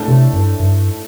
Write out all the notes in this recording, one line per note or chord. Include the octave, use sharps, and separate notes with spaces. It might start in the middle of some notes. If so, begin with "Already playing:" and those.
Already playing: A2 A3 D4
C3
G2
G2